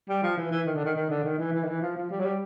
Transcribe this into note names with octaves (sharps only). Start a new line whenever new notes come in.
G3
F3
E3
E3
D#3
D3
D#3
D#3
D3
D#3
E3
E3
D#3
E3
F3
F3
G3
F#3
G3